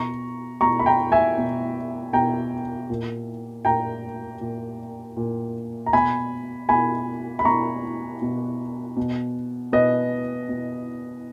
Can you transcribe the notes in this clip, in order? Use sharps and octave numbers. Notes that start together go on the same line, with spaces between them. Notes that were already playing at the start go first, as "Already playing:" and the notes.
Already playing: B2 A#5 C#6
B2 A#5 C#6
B5
G5 A#5
E5 G#5
B2
B2 G5 A#5
A#2
A#2 G5 A#5
A#2
A#2
A#5
B2 G#5 B5
B2 G#5 B5
B5
B2 A#5 C#6
B2
B2
B2 B4 D#5
B2